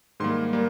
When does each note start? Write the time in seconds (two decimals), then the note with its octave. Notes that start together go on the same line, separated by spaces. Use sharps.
0.20 G#2 D#3 G3 A#3 C6
0.53 G3 A#3